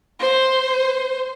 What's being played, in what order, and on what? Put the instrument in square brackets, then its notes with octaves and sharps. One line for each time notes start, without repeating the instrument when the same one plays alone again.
[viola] C5